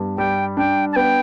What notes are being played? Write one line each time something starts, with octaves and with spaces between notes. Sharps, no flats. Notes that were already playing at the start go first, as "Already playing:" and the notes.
Already playing: G2 B3
G3 G5
D4 G5
A5
B3 G5